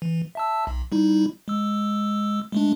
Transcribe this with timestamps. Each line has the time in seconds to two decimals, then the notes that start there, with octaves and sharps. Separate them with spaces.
0.02 E3
0.35 E5 A5 E6
0.67 B1
0.92 G3 D#4 E4
1.48 G#3 E6
2.52 G#3 A3 D4